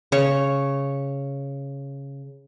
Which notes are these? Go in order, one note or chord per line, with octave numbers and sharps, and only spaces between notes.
C#3 C#5 C#6